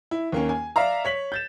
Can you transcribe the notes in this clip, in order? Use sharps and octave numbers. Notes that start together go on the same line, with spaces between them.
E4
D#2 A#3 C#4
G#5
D5 E5 F5 A#5
C#5 B6 F#7
G6 A6 E7